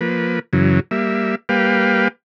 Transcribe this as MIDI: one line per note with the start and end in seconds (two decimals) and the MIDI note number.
0.01 0.39 53
0.01 0.39 58
0.01 0.39 71
0.53 0.80 42
0.53 0.80 49
0.53 0.80 52
0.53 0.80 54
0.91 1.35 55
0.91 1.35 58
0.91 1.35 76
1.49 2.08 55
1.49 2.08 58
1.49 2.08 71
1.49 2.08 77
1.49 2.08 79